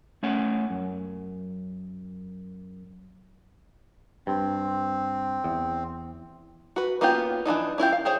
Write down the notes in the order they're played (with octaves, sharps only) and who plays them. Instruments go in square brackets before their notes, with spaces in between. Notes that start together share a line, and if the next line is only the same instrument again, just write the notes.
[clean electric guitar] A3 C#4 C#5 F#5
F#2
[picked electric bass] G2 [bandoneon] C4
[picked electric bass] E2
[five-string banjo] F#4 B4
A#3 B3 C#4 F4 G4
E3 F3 D4 D#4
C#4 E4 F4 G4
F5
G4 G#4 C5 C#5